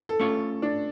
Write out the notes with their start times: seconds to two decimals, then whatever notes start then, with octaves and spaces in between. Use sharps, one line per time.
0.09 A4
0.20 A3 C#4 F4 C#5
0.62 D4